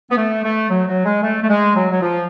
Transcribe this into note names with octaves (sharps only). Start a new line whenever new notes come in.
B3
A3
A3
F#3
F#3
G#3
A3
A3
G#3
F#3
F#3
F3